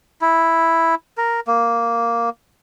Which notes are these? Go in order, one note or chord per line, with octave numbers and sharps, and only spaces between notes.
E4
A#4
A#3